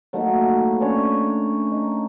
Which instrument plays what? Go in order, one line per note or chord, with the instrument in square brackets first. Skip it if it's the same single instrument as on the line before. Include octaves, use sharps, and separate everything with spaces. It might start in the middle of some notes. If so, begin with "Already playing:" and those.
[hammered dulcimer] F#3 A3 A#3 D#4
E4
C#4 D4 C#5
D#4